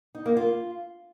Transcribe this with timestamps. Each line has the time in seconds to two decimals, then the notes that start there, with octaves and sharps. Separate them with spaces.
0.15 D#4
0.26 A#3
0.37 F4